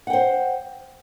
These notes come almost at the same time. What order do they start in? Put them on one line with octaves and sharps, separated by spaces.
F#5 G5 C5